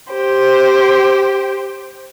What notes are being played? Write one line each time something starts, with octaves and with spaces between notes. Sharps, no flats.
G4 C5